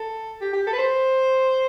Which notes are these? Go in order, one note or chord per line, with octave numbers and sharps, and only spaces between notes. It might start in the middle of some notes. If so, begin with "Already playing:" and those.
Already playing: A4
G4
G4
A4
B4
C5